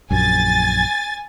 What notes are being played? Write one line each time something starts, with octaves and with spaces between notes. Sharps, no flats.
A#1 F#2 G#5 A6